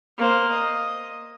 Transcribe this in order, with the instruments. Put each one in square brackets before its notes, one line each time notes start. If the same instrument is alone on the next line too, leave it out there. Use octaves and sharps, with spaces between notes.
[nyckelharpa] A#3 C5
D#5